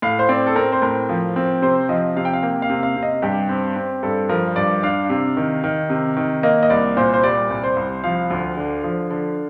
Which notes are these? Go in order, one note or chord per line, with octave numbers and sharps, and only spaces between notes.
A2 F5
C5
C4 D5
A4
C4 A#4
C5
A2 A#4
F3
C4
C3 C5
F3 D#5
C3 F5
G5
F5
A#3 G5
F5
C3
F5
C3
D#5
G2 G4
C4
C4
G2 A4
F3 A#4
G2 D5
D4 F5
C3
D#3
D#3
C3
D#3
A#3 D#5
D#5
C2 D5
A#2 C5
C5
G3 D5
C2
C5
C2
F3 F5
D2
D3
F3
D3